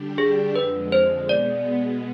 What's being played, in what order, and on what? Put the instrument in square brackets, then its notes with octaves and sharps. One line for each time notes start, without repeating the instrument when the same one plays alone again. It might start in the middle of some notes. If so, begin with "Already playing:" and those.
Already playing: [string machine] D3 G3 D4 G4
[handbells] G#4
[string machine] F2 D3 G#3 [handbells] B4
[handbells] C5
[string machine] B2 G#3 B3 [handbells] D5